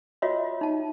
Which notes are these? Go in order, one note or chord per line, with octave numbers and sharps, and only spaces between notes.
F4 F#4 C#5 D#5 E5
D#4 A5